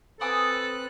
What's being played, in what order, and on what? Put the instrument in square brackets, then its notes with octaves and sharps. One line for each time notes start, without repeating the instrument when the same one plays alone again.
[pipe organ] C4 B4 F#6 [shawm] A4 [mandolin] G#5 D6 D#6